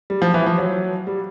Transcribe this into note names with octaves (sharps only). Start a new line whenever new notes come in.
G3
F3
E3
F3
F#3
G3